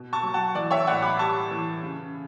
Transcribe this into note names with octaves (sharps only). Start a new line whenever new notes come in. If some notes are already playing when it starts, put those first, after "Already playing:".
Already playing: B2
A5 C#6
F#3
F#5 A5
E3 D5
C#5 E5
A2 D5 F#5
B5 D6
G3 A5 C#6
E3
C#3